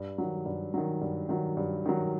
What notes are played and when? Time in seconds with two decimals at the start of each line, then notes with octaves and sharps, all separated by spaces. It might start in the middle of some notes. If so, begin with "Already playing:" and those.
Already playing: G2
0.18 D#3 F#3
0.46 G2
0.74 D#3 F#3
1.02 G2
1.29 D#3 F#3
1.57 G2
1.85 D#3 F#3